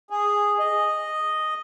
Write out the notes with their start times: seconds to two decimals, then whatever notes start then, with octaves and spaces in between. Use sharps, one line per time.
0.10 G#4
0.59 D#5